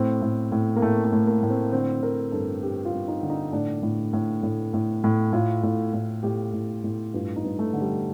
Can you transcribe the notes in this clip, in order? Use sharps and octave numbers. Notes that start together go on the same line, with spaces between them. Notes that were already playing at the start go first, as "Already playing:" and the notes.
Already playing: A2 C4
A2
A2
A#3
A2 A3
A3
A2
A#3
A2
C4
D3 C4
D3 A#4
G2 A4
G2 G4
F4
G2
D#4
D3
D#4
A2 D4
A2
A2
A2
A2
A2
A2 F4
A2
A2
A2 G4
A2
A2
G2 F4
D#4
G2
A3
D3
G3